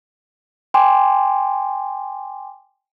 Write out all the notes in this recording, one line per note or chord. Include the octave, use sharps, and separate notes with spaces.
G5 G#5 C6 D6